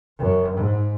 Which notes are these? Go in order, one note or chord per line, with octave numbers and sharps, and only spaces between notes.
F#2
G#2